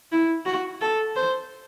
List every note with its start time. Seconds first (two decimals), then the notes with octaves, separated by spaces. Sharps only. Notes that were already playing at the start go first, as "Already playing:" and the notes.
0.12 E4
0.46 F#4
0.81 A4
1.16 C5